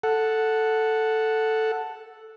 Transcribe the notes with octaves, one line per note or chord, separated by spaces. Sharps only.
A4 F#5